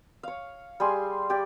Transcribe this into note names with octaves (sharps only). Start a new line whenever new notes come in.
C#5 F5
G3 G#4 G#5 C6
G4 D5